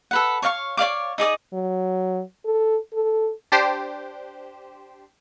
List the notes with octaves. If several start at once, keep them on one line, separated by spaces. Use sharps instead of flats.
A4 B4 F#5
C#5 D5 F5 C#6
C#5 D5 F5 D6
D#4 G#4 D5 D#6
F#3
A4
A4
D4 G4 C5